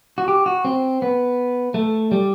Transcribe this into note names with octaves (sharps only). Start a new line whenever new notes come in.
F#4
G4
F#4
C4
B3
A3
G3